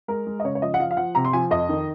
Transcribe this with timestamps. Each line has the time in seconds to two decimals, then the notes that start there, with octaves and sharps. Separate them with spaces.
0.08 G#3 A#4
0.27 G#3
0.40 D#5
0.44 C#3 C#5
0.55 C#5
0.62 F3 D#5
0.74 F#5
0.79 F3 F5
0.91 F5
0.97 F3 F#5
1.15 C3 A#5
1.25 C6
1.33 F3 G#5
1.51 F2 D#5
1.69 D#3